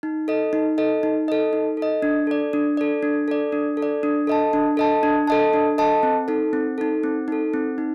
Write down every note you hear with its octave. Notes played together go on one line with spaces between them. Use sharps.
D#4
A4 D#5
D#4
A4 D#5
D#4
A4 D#5
D#4
A4
D#5
D4
A4 D5
D4
A4 D5
D4
A4 D5
D4
A4
D5
D4
A4 D#5 A5
D4
A4 D#5 A5
D4
A4 D#5 A5
D4
A4 D#5 A5
C4
D#4 A4
C4
D#4 A4
C4
D#4 A4
C4
D#4